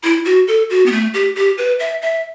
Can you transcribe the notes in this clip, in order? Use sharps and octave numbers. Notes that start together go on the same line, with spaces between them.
E4
F#4
A4
F#4
B3
A3
G4
G4
B4
E5
E5